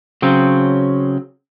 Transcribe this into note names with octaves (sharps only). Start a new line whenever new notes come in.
C#3 F#3 C4